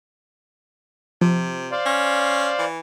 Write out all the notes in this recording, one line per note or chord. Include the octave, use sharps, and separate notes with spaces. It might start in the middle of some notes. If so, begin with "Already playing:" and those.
C3 F3
C5 D5 F5
C#4
E3